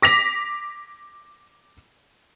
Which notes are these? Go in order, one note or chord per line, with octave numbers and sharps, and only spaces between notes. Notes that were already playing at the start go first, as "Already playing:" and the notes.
D6 A#6 B6 F7